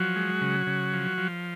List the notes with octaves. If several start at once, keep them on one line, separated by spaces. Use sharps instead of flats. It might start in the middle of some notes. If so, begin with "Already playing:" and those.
Already playing: F3 F#3 F#4
G#3
C#3
C#3
F3
F3